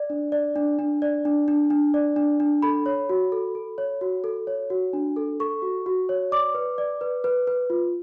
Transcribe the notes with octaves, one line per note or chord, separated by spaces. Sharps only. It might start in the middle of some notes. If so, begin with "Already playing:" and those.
Already playing: D5
D4
D5
D4
D4
D5
D4
D4
D4
D5
D4
D4
A4 B5
C#5
F#4
A4
A4
C#5
F#4
A4
C#5
F#4
D4
A4
A4 C#6
F#4
F#4
C#5
D5 D6
B4
D5
B4
B4
B4
F4